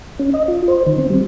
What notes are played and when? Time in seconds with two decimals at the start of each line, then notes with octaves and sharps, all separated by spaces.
0.19 C#4
0.34 D#5
0.48 F4
0.68 C5
0.87 D#3
0.98 C4
1.10 G3